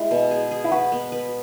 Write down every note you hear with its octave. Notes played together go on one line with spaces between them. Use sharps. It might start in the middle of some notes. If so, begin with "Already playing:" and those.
Already playing: G#3 E4
B2
G#4
G#4
E4
F#4 B4
B3
B4